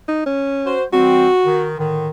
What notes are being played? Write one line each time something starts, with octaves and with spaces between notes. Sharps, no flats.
D#4
C#4
F#4 C5
E3 G3 C4 F#4
D#3
A2 D3 D#3